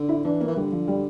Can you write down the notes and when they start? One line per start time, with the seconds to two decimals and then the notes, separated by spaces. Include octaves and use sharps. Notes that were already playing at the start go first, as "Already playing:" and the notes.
Already playing: D3
0.09 E4
0.25 E3 D4
0.41 A#3
0.48 E3
0.56 D3 G3
0.72 F3
0.88 G3